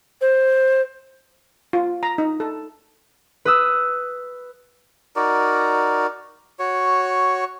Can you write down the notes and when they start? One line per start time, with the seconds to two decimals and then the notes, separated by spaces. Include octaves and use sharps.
0.21 C5
1.73 F4
2.03 A#5
2.18 D#4
2.40 A4
3.45 B4 D#6 E6
5.16 D#4 F#4 A#4 D5
6.59 F#4 C#5